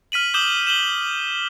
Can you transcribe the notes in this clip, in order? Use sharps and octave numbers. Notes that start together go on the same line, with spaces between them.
F6 B6 D#7 F#7
D6 D#6 G6 E7 F#7 G7
E7 F#7 G7